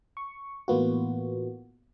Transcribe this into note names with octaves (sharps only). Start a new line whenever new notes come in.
C#6
A2 E3 A#3 B3 F4 F#4